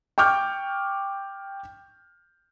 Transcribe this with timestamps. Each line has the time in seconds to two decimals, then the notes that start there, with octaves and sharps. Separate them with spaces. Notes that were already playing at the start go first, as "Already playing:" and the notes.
0.18 G5 C#6 D6 F6 G6